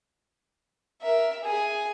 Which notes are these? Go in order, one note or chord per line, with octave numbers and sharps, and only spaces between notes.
A#4 E5
G#4 G#5